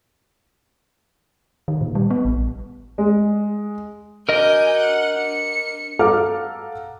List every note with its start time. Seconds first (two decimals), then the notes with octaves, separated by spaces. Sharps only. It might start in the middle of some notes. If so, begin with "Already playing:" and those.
1.68 D#3
1.81 A#2
1.95 G3
2.10 B3
2.25 A1
2.98 G#3
4.29 D4 F#4 A#4 D#5 G#5 G6
4.77 F#5
5.16 D4 C#7
5.99 A4 F5 F#5 A#5 D6 F6